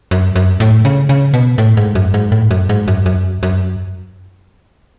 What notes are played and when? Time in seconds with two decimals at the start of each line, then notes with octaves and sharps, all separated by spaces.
0.11 F#2
0.36 F#2
0.60 A2
0.85 C#3
1.09 C#3
1.34 B2
1.58 A2
1.77 G#2
1.95 F#2
2.14 G#2
2.32 A2
2.51 F#2
2.69 G#2
2.88 F#2
3.06 F#2
3.43 F#2